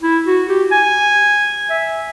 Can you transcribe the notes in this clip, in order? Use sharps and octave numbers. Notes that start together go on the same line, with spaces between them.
E4
F#4
G4
G#5
E5